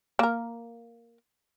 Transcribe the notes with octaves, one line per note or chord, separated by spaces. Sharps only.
A#3 A#4